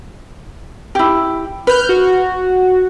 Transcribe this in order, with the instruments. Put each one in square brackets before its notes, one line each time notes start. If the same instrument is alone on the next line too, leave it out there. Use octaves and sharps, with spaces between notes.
[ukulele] E4 G4
[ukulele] B4 [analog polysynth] F6 G6
[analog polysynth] F#4